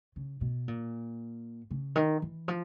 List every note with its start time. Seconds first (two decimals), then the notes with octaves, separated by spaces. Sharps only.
0.16 C#3
0.41 B2
0.68 A#2
1.71 C#3
1.96 D#3
2.22 E3
2.48 F3